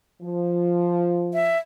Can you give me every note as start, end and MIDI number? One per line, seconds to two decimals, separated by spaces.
0.22 1.54 53
1.34 1.58 76